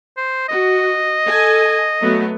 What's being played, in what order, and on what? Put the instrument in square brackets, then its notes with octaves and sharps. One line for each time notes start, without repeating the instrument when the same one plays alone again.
[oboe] C5
[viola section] F#4 [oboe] D#5
[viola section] A4 G#5
F#3 A3 B3